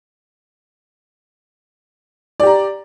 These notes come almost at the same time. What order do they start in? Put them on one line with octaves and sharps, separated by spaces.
D5 G4 A#5